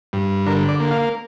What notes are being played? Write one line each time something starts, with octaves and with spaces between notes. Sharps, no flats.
G2
D3 A#4
D5
A#3
F5